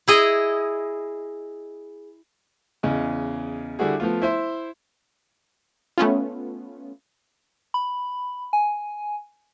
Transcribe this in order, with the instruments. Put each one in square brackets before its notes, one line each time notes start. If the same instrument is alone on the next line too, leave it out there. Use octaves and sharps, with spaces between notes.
[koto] E4 G#4 D#5
[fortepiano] E2 C#3 D#5
D3 G3 E4 F#4 G#4
F3 A3 B3 F4
E4 C5 E5
[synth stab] A3 B3 C#4 F4
[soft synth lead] B5
G#5